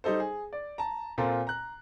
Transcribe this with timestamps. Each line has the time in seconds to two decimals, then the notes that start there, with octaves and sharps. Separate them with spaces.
0.04 G3 D#4 A4 C5
0.20 G#4
0.53 D5
0.78 A5 A#5
1.18 A#2 C4 F4 A4 A#4
1.47 A#5 F#6